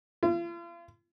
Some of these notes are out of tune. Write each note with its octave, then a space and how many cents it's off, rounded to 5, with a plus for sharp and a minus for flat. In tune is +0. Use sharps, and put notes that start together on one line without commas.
F4 -40